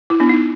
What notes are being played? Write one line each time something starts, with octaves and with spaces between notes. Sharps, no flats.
E4
B3 D4
D#4